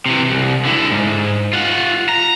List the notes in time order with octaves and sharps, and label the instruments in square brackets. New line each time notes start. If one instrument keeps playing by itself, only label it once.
[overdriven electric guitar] C3 E3
C2
D3 E4
G#2
F4 F#5
A#5